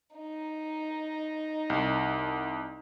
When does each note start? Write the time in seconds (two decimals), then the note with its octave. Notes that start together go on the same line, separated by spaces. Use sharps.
0.16 D#4
1.70 C2